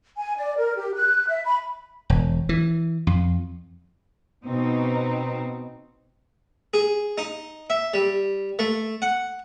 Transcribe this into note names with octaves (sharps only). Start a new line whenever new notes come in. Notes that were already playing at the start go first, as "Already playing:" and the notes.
G#5
D5
A#4
G4
F#6
E5
B5
E1
E3
F2
B2 C4 D#4
G#4
D#4
E5
G3
A3
F#5